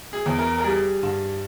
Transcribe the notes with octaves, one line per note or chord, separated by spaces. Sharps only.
G#4
E2
A#4
A#4
G3 G#4
G2